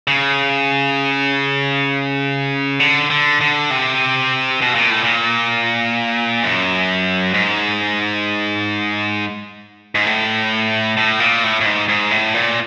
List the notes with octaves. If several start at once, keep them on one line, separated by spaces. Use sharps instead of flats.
C#3
D3
D3
D3
C3
B2
A#2
A2
A#2
F#2
G#2
G#2
A2
A2
A#2
A2
A2
G#2
G#2
A2
A#2